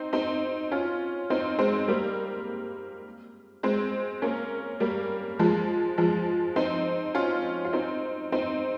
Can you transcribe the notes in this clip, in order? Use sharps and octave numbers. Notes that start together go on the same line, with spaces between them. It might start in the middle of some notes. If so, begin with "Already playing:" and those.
Already playing: C4 D#4
C4 D#4
C#4 F4
C4 D#4
G#3 C4
G3 A#3
G#3 C4
A#3 C#4
G3 A#3
F3 G#3
F3 G#3
C4 D#4
C#4 F4
F4
C4 D#4
C4 D#4